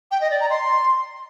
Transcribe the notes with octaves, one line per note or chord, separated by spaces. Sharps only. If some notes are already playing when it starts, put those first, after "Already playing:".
G5
D#5
D5
A#5
C6